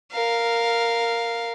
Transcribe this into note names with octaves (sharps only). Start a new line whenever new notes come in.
A#4 F5